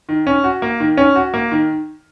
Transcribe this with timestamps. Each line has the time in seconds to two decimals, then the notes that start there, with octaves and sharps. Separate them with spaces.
0.09 D#3
0.27 C#4
0.44 F#4
0.62 A#3
0.80 D#3
0.97 C#4
1.15 F#4
1.34 A#3
1.51 D#3